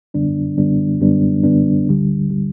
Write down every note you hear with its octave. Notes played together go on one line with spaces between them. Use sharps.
F#2 D3 G3 B3 D4
F#2 D3 G3 B3 D4
F#2 D3 G3 B3 D4
F#2 D3 G3 B3 D4
D2 D3 G3
D3 G3